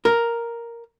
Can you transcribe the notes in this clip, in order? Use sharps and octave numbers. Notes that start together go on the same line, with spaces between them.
A#4